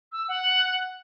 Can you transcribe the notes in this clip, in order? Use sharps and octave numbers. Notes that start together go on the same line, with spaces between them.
E6
F#5